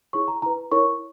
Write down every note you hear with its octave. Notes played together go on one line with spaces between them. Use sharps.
E4 G#4 C#5 C#6
A#5
E4 B4 A#5
E4 A#4 C#5 C#6